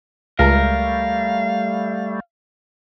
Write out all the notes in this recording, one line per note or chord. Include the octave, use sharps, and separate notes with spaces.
C#2 G3 A3 A#4 F5